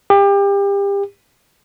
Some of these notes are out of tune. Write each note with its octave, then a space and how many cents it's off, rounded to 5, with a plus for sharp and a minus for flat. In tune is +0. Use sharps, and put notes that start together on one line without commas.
G4 +30